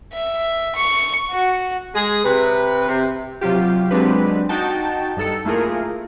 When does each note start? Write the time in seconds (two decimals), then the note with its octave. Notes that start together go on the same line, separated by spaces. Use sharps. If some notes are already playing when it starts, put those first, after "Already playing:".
0.13 E5
0.75 C#6
1.30 F#4
1.94 G#3 G#4
2.24 C3 B4
2.88 C3
3.41 C3 F#3 F4 G4
3.91 F#3 G#3 C4 D4 G4 B4
4.49 D#4 F#4 G5 A5
5.17 G2 D#4 A4 C#7
5.45 A3 A#3 E4 F4 G#4 A#4